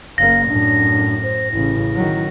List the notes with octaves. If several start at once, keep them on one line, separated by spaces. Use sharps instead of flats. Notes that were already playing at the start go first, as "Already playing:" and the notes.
F#1 A#3 F5 A#6
F#2 A2 D4
C5
A1 C#3 E4
D#3 F#3